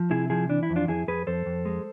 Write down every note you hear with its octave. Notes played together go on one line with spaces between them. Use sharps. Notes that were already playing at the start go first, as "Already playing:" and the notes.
Already playing: F3
C3 E4 G#4
F3 E4 G#4
E3 D4
E4
F2
D4 F4
F2 E4 G#4
F2 G#4 B4
F2 A4 C5
F2
G#3